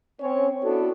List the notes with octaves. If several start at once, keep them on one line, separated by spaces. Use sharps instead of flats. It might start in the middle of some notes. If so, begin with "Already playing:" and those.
C4 C#4 C#5
B3 D4 E4 F#4 A4